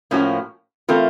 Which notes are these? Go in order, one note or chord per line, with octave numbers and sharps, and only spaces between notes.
A2 F3 A#3 C#4 F#4
E3 A3 C4 F4 A#4